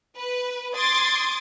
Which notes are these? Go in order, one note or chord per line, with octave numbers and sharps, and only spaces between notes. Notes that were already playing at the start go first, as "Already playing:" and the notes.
B4
C6 D6 D#6 G#6 A6